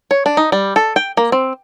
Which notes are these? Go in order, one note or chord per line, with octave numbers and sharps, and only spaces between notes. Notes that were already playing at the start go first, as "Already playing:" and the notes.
C#5
D4
D#4
G3
A4
G5
A#3
C4